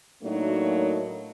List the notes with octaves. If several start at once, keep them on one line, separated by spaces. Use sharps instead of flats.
A2 F#3 A3 A#3 D4 D#4